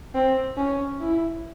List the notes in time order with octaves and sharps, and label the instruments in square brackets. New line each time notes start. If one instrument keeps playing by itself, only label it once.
[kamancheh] C4
C#4
E4